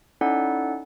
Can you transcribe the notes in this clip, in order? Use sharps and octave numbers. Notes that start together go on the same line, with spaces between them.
C#4 D#4 E4 A4 D5 F#5